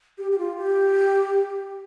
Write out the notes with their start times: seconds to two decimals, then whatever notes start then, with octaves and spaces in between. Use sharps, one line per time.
0.18 G4
0.32 G4
0.38 F4
0.57 G4